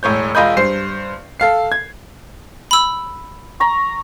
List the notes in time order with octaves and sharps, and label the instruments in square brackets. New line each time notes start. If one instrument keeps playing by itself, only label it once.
[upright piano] E1 A2 C#5 G6
E1 F4 D#5 G#5 B5 G6
G2 C5 C7
A4 F5 C7
G#6
[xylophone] B5 E6
[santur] A#5 C#6